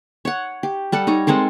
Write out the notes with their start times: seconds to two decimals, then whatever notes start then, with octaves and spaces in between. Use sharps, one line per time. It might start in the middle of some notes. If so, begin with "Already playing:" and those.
0.25 C#5 F#5
0.63 G4
0.92 G3 A4 F#5
1.07 D#4 C#5 A#5
1.27 G#3 C4 A4 A#4